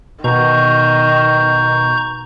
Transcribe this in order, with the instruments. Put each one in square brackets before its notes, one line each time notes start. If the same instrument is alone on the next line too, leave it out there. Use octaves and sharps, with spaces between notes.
[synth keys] B2 [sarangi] D#3 [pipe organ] A#5 C#6 G6